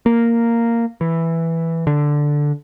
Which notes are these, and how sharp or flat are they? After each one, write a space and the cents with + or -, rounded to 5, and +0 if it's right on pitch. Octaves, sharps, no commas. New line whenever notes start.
A#3 -5
E3 +0
D3 +0